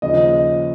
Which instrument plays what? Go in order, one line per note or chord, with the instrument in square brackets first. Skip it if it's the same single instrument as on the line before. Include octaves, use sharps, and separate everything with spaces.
[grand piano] D#2 C#3 F3 D#5